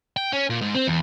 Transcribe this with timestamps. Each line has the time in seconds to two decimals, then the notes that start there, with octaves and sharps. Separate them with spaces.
0.17 G5
0.33 C#4
0.50 A#2
0.61 G#2
0.75 C4
0.87 E2